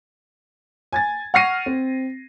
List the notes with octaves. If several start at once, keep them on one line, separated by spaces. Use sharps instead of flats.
G#5 G#6 A6
F#5 C#6 F6 A#6 C7 D#7
C4